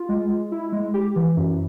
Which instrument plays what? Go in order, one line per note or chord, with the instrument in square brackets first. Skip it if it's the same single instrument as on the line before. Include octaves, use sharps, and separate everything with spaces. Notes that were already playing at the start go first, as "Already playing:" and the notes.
Already playing: [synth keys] F4
G#3
G#3
E4
G#3
G4
E3
F#2